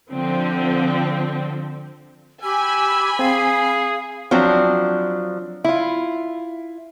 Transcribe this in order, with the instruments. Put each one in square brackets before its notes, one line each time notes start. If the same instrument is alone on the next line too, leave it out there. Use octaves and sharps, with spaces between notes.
[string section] D3 F3 C4
[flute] G4 [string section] G#5 B5 [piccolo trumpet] E6
[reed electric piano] C4 [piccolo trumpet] G#4 [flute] F5
[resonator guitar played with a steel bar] F3 F#3 C4 D4
E4 F4